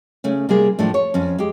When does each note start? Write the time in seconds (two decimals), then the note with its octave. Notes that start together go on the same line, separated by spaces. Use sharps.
0.24 C#3 A3 C#4
0.49 C3 G3 A#3 G#4
0.79 A2 F3 A3 D4
0.94 C#5
1.14 F2 C#4
1.38 G#3 G4